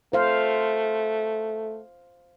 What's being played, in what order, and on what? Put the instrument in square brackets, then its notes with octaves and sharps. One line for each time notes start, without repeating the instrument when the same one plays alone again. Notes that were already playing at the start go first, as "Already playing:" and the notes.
[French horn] A3 [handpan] C5 F5